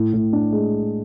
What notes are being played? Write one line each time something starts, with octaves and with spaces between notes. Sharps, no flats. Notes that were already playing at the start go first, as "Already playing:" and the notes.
Already playing: A2
A2
D4
G#3